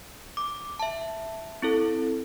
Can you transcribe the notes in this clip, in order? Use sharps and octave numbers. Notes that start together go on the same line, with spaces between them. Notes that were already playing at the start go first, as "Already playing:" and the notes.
D6
E5 A5
C4 E4 A4